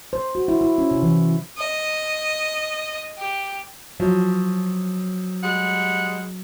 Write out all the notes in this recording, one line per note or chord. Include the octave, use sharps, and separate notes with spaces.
C5
F#4
E4
E4
C#4
C3
E3
D#5
G4
F3 F#3
G3 G#3 F#5